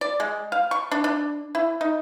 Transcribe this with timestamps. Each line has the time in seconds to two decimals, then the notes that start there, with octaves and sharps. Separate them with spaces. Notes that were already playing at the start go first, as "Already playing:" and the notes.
0.01 D5
0.20 G#3
0.52 F5
0.71 C#6
0.92 D4
1.04 D4
1.55 E4
1.81 D#4